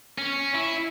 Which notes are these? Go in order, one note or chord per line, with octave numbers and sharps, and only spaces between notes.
C#4
E4